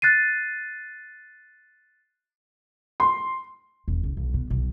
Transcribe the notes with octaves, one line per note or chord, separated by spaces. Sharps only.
F#6 A6 C7 D#7
C6
E1
C#2
B1
B2
B1